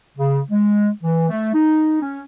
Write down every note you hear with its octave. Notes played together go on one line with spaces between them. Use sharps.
C#3
G#3
E3
A3
D#4
C#4